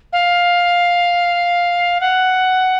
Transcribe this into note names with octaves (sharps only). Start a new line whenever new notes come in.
F5
F#5